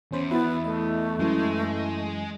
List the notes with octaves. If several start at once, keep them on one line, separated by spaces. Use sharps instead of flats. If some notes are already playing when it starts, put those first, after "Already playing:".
E2 C#4 C5 B5
B3 E4 F#6 A6
A3 D#5
F#2 E3 G#3